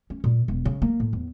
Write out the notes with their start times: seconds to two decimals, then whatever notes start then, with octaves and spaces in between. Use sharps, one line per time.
0.10 C#4
0.24 A#2
0.48 E1
0.65 C#3
0.82 A#3
1.00 A2
1.13 E2